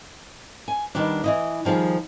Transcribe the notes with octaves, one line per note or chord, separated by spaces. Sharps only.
G#5
D#3 G3 B3 D4
E3 E4 D#5
D#3 F3 G3 G#4